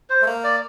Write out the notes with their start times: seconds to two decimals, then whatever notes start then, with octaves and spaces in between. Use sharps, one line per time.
0.10 C5
0.22 A3
0.27 A#3
0.44 D5